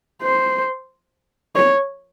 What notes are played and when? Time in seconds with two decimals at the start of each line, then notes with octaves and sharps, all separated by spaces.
0.23 C5
1.56 C#5